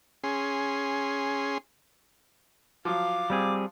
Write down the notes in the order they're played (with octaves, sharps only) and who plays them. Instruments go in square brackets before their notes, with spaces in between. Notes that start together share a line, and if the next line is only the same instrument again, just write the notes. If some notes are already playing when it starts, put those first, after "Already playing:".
[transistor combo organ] C#4 G#4 C6
[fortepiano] F3 F#3 [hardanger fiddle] F5 [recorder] D6
[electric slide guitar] G3 C4 G#4